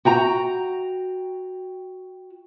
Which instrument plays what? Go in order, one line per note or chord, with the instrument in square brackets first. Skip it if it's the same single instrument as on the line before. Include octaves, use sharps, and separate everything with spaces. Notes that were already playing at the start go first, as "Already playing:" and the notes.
[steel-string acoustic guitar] F#4 G5 A#5